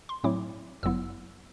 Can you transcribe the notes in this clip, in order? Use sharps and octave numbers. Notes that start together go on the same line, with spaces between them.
C6
A2 F#3 A3 C4 E4 D6
G1 F#2 F#3 B3 E4 E6